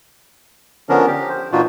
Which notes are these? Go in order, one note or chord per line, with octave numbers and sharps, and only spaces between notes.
D3 F3 B3 C#4 D4 A#4
G4
C5
A#2 E3 D4 D#4 F4 F#4